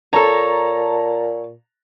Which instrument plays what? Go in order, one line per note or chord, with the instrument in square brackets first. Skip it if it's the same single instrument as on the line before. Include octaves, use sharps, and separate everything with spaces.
[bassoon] A#2 [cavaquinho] A4 C#5 [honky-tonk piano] A5 A#5